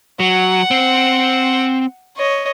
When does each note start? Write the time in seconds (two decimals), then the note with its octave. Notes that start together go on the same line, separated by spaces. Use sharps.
0.20 F#3 F#5
0.71 C4
2.16 C#5 D#5